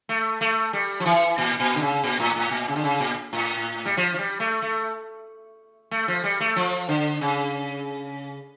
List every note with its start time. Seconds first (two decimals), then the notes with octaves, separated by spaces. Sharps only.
0.09 A3
0.41 A3
0.73 G3
1.00 F3
1.06 E3
1.38 A#2
1.60 A#2
1.75 D3
1.81 C#3
2.04 A#2
2.20 A2
2.36 A2
2.51 A#2
2.68 C#3
2.76 D3
2.84 C#3
3.00 A#2
3.33 A2
3.85 G3
3.97 F3
4.14 F3
4.19 G3
4.40 A3
4.62 A3
5.91 A3
6.08 F3
6.24 G3
6.40 A3
6.56 F3
6.89 D3
7.21 C#3